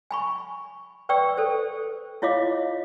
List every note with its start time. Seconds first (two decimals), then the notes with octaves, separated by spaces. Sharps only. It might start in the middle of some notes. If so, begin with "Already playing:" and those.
0.11 G#5 B5 C#6
1.09 B4 D5 G5 C#6 E6
1.37 A4 C5
2.22 E4 F4 C#5 D#5 F5 D6